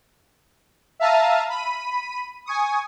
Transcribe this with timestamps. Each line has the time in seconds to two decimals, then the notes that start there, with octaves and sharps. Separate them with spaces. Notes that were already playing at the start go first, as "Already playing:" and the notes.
1.00 E5 F5 A5 A#5 F6 D#7
1.50 B5 D#7
2.46 G#5 C#6 D#6